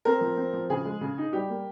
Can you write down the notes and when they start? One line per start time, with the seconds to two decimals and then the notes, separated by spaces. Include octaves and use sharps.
0.05 C4 A#4
0.21 F3
0.37 C4
0.53 F3
0.70 C#3 G#4
0.85 G#3
1.01 C#3
1.18 D#4
1.33 G3 G4
1.49 A#3